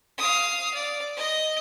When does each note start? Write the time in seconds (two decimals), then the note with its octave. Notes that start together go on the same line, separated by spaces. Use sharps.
0.18 F5 D#6
0.74 D5
1.17 D#5